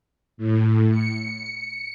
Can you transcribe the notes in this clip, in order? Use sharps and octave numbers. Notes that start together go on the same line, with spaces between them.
A2
C#7